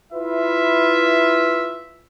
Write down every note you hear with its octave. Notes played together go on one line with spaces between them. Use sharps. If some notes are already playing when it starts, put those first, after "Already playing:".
E4 F4 B4 E5